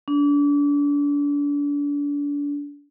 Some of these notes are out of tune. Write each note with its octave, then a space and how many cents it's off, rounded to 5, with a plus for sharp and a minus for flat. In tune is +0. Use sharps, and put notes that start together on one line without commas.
D4 -35